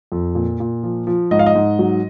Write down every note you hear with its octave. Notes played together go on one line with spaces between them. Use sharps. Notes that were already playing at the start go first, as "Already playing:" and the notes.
F2
A#2
A#2
F3
F3
G#2 D#5
F5
D#5
G#2
F#3